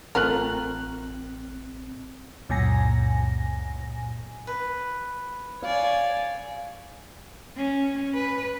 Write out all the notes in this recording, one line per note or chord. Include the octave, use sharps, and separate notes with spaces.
A1 A3 C4 F4 A#4 F#6
C#2 F#2 A#2 G#5 A#6
B4
C#5 D5 F5 G#5
C#4
B4